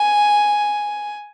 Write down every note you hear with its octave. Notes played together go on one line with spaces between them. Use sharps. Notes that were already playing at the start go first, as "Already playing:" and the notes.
Already playing: G#5